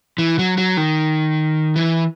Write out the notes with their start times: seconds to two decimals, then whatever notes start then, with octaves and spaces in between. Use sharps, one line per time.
0.18 E3
0.39 F#3
0.58 F#3
0.77 D#3
1.76 E3